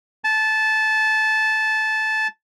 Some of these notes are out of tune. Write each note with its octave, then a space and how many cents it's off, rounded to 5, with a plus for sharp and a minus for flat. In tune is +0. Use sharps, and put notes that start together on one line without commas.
A5 -15